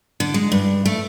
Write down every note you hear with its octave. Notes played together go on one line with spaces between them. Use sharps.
D3
G#3
G2
A3